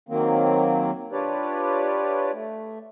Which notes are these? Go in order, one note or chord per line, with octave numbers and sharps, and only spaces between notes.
D#3 F#3 A#3 C4
D4 F4 G4 B4 C#5 D5
A3